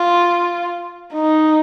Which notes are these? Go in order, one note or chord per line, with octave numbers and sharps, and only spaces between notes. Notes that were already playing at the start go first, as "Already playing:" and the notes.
Already playing: F4
D#4